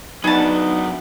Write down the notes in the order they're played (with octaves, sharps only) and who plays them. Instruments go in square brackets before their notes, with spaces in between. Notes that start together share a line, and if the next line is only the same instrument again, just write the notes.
[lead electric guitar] F#3 D4 [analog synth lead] B3 [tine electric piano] D#4 [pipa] G#4 A5